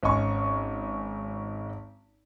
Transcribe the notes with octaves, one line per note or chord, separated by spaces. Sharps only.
G#1 C#4 D#5 G#5 C#6